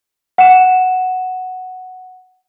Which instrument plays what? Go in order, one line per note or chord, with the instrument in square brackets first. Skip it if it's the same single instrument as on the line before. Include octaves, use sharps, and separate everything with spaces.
[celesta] F#5 E7